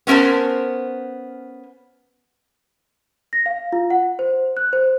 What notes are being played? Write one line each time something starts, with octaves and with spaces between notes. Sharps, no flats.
B3 C#4 A#4 C5 A5
A#6
F5
F4
F#5
C5
F#6
C5